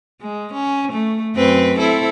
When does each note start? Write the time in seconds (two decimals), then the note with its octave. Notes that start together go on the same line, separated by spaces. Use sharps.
0.21 G#3
0.53 C#4
0.92 A3
1.36 F#2 C4 B4
1.79 C4 E4 A4